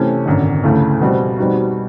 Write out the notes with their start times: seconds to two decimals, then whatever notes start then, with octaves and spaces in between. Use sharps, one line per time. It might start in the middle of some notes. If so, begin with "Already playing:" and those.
Already playing: C3 E3 A3 C#4
0.26 G#1 F#2 D3
0.64 D2 C#3 E3 A3
1.01 B2 G3 C4
1.37 B2 G3 C4 D#4 F#4